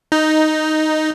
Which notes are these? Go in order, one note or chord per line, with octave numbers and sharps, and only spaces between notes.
D#4